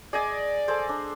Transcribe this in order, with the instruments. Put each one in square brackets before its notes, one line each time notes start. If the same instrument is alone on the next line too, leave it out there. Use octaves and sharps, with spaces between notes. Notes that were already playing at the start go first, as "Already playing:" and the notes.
[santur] G#4 D#5 G#5 [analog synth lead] D5
[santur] G#4 A4 C5
D4